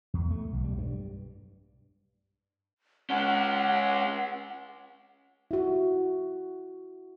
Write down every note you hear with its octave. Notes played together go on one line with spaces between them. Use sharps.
E2
A3
B1
G3
G2
G#3 C#4 F#5
E4 F#4